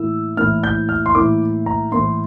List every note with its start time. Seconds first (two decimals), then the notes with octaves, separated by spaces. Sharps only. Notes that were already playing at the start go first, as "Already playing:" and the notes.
Already playing: A2 E3 A#3 E4 E6
0.37 A2 E3 A#3 E4 F6
0.64 G6
0.89 F6
1.06 C6
1.15 A2 E3 A#3 E4 D6
1.66 A#5
1.92 A2 E3 A#3 E4 C6